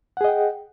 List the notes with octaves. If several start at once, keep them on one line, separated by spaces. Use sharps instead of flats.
G#4 D#5 F#5 G5